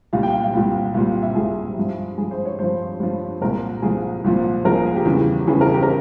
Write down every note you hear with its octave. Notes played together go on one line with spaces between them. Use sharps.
C2 A#2 G3 F5
G5
F5
F5
C2 A#2 G3
C2 A#2 G3 F5
E5
C2 A#2 G3 G#4
G2 F3
G2 F3 G#4
C5
C#5
G2 F3 C5
G2 F3
C2 A#2 F3 A#4
C2 A#2 F3 G#4
C2 A#2 F3
C2 A#2 F3 A#4
G#4
G#4
G4
E2 C#3 E3 G3
E2 C#3 E3 G3 G#4
A#4
G4
A#4